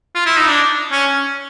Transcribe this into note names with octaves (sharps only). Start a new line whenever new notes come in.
F4
E4
D#4
D4
C#4